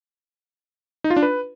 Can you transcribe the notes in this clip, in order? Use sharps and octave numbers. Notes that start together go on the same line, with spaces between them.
D#4
F4
D4
B4